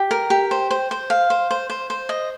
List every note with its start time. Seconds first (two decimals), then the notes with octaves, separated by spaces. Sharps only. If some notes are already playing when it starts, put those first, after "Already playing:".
Already playing: G4
0.11 A#4
0.30 G4
0.51 C5
0.71 C5
0.91 C5
1.10 F5
1.30 C5
1.51 C5
1.70 C5
1.90 C5
2.09 D#5